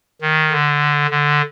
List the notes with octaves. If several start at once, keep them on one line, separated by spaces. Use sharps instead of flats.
D#3
D3
D3